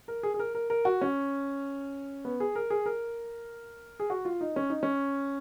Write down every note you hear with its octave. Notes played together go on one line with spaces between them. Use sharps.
A#4
G#4
G#4
A#4
A#4
A#4
F#4
C#4
B3
G#4
A#4
G#4
A#4
G#4
F#4
F4
D#4
C#4
D#4
C#4